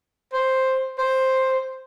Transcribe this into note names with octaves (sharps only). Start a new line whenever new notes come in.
C5
C5